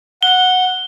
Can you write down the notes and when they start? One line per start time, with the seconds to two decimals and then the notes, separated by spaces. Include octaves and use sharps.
0.23 F#5 G7